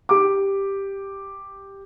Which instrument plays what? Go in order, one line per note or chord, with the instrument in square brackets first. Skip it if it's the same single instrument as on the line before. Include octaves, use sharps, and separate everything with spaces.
[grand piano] G4 D6